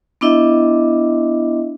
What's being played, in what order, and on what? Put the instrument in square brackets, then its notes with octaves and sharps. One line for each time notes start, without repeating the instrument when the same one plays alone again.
[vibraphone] B3 D4 E4 D#5 E5